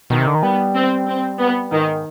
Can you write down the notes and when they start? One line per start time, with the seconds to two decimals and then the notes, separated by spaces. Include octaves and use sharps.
0.10 B2 D#3
0.18 C3
0.27 D3
0.35 D#3
0.43 G3 B3
0.75 C4
1.07 C4
1.39 B3
1.72 G#2 D#3